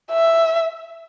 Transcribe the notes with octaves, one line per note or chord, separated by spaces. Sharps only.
E5